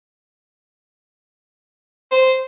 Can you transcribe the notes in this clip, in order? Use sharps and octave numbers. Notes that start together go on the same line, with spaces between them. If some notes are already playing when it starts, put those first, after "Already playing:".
C5